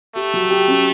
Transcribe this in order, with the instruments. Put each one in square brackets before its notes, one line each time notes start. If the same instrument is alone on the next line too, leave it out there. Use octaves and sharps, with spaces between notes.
[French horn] A3 [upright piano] G4
[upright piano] F#3
G4
C#4